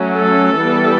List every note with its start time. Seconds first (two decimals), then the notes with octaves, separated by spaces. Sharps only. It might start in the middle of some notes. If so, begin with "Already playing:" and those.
Already playing: F#3 A3 C#4
0.14 A4
0.58 E3 G3 B3